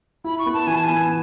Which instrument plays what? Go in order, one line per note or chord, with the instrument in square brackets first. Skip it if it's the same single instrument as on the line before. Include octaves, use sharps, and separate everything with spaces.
[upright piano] E4 [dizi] B5
[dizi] C#6
[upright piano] B3
[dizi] A5
[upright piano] E3 [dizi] G#5
[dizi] A5
[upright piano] B3 [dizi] G#5